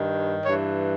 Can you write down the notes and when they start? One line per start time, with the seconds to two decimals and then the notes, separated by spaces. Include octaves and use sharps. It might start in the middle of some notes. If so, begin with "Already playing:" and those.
Already playing: G2 D#3
0.44 G2 E3 C#5